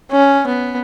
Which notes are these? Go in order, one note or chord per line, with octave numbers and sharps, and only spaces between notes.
C#4
B3